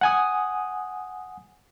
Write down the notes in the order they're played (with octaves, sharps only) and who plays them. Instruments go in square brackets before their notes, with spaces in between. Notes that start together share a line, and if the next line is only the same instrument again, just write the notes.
[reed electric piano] F#5 G#5 D#6